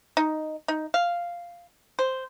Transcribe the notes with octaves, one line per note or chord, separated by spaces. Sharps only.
D#4
D#4
F5
C5